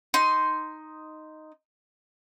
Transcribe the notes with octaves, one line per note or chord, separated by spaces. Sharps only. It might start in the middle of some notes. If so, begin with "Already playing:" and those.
D#4 C6